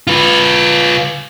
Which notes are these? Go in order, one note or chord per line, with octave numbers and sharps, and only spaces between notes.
F4 B4